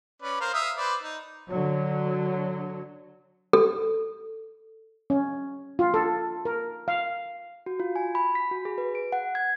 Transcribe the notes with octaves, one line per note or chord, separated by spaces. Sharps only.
C#4 B4 D5
A#4 C5 F5
E5 F5 D#6
B4 C5 D5
D#4
D3 F#3
A4
C#4
F4
A4
A#4
F5
F#4
F4
G#5
B5
B6
F#4
G#4
B4
D7
F#5
G#6